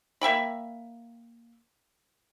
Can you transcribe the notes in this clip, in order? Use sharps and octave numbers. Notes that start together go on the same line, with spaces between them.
A#3 E5 G5 B5